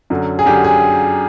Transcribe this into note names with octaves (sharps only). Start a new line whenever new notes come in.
F#2 D3 F#3
G#4
F#2 D3 F#3 G4
G#4